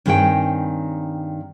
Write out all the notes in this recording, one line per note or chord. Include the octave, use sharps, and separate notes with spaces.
G2 D#3 C4 G#4 C#5 G5